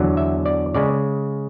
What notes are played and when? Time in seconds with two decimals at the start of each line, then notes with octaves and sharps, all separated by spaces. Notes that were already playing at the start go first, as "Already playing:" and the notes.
Already playing: E2 D3 F#3
0.17 E5
0.46 D5
0.74 C#3 G#3 D5